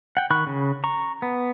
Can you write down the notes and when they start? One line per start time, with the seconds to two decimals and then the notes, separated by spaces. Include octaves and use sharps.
0.17 F#5 G5
0.30 D#3 B5 C#6 F#6
0.47 C#3
0.84 A#5 C#6
1.22 B3